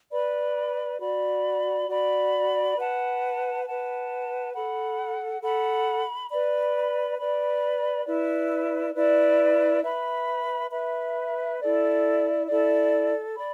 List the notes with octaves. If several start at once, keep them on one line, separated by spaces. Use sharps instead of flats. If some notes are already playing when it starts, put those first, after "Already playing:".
B4 D5 B5
F#4 D5 B5
F#4 D5 B5
B4 F#5 A5
B4 F#5 A5
A4 F#5 B5
A4 F#5 B5
B4 D5 B5
B4 D5 B5
E4 B4 D5
E4 B4 D5
B4 E5 B5
B4 E5 B5
E4 A4 D5
E4 A4 D5
D5 B5